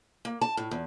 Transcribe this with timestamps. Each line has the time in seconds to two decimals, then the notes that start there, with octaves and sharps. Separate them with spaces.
0.25 A#3
0.41 A5
0.57 A2
0.71 E2